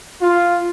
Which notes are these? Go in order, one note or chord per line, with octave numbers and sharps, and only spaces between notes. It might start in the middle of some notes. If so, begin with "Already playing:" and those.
F4